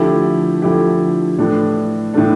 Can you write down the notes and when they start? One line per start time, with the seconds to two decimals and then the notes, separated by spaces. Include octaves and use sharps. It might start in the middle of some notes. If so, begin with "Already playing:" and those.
Already playing: D3 F3 A3 E4 G4
0.62 D3 F3 A3 E4 G4
1.38 A2 E3 A3 D4
2.13 A2 E3 A3 D4